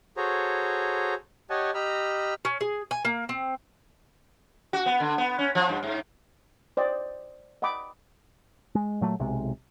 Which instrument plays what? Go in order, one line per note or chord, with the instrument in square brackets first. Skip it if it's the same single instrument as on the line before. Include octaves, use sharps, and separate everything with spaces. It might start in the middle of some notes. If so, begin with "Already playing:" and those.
[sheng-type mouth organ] F#4 G#4 A4 C5 C#5 A#5
G4 C#5 D#5 F#5 G#5 A5
G4 D#5 A#5 B5 E6 F6
[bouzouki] C#4
G#4
G#5
A#3
C4
[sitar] F#4
B3
D3
B3
C#4
F3
G2
G#2
[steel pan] C5 D5 D#5 G5
D#5 F#5 G5 B5 D6
[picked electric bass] G#3
A#2 F#3 A3
B1 C3 G#3